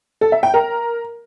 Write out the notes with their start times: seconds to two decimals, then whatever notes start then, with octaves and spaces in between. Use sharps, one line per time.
0.21 A4
0.32 E5
0.43 G5
0.54 A#4